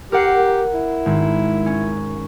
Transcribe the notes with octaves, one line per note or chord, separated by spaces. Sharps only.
G4 A#4 F#5 C7
E4
G#1
C#4